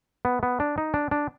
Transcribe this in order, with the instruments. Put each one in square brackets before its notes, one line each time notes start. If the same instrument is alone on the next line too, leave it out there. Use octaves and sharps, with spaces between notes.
[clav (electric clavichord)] B3
B3
D4
D#4
D4
D4